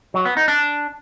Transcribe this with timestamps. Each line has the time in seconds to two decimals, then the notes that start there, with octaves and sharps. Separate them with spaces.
0.14 F#3
0.25 B3
0.37 D#4
0.48 D4